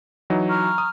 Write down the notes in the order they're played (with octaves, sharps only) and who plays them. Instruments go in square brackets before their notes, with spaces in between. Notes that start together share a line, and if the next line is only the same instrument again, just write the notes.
[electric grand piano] E3 F#3 D#4
[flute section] A#5 C#6 F6
[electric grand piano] D#6